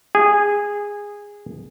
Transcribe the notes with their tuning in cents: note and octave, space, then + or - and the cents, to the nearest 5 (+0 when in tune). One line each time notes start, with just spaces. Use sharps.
G#4 -15